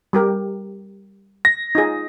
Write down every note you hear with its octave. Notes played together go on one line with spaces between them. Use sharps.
G3 G4 A#4
A#6
D#4 F4 G#4